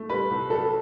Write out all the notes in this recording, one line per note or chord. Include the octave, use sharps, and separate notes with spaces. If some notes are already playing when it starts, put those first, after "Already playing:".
Already playing: A3
G3 B4
C2
F#3 A4